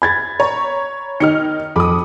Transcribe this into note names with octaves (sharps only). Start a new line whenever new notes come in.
B5 G#6 A6
C#5 A#5
D#3 D#4 F6 C#7
F2 B5 D6 D#6